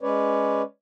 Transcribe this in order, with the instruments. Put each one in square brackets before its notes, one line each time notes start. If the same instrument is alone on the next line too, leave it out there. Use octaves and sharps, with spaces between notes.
[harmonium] G#3 C#4 B4 C#5 D5